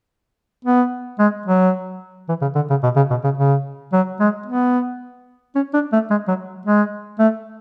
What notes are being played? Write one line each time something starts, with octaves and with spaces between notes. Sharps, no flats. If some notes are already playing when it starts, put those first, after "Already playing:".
B3
G#3
F#3
E3
C#3
D3
C#3
B2
C#3
B2
C#3
C#3
F#3
G#3
B3
C#4
D4
A3
G#3
F#3
G#3
A3